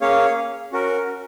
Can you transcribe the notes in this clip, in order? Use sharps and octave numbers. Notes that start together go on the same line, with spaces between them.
A#3 C#4 G#4 C#5 F5
C#4 F#4 A#4